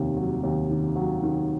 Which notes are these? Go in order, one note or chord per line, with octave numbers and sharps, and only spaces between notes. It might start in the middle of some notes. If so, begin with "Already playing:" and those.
Already playing: F1 D#2 D#3
F#3
D#2
D#3
F#3
D#3